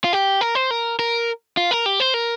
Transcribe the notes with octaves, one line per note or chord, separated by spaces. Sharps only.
F4
G4
A#4
C5
A#4
A#4
F4
A#4
G4
C5
A#4